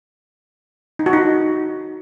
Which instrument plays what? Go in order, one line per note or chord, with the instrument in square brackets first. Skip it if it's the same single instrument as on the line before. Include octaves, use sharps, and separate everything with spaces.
[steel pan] D#4
F#4
D#4